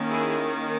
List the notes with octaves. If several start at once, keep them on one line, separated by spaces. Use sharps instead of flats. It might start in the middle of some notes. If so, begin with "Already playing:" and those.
Already playing: D#3 A#3 C#4
E4 G#4